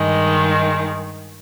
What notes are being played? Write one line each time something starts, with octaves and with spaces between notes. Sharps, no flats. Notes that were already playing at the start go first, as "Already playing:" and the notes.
Already playing: G2 D#3 G#3